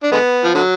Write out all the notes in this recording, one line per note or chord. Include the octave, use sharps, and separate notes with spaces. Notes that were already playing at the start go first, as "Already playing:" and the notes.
D4
D3 G#3 B3
F3
D3 F#3